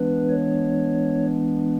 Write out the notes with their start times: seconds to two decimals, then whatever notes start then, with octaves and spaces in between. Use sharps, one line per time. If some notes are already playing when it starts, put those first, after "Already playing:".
Already playing: E3 G#3 B3 D4 B4
0.30 C#5